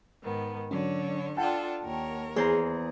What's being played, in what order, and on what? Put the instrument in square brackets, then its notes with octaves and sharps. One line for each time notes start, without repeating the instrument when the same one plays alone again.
[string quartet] G#2 D#3 B3
[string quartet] D3 C#5 [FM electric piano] F#3 C#4
[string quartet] D4 F4 A4 [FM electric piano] F#5 G5 A5
[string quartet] D#2 A#4 C#5
[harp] E2 C5 A#5 [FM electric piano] G#4